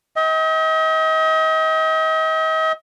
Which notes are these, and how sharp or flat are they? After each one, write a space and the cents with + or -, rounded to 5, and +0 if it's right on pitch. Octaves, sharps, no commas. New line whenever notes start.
D#5 +40 G5 +0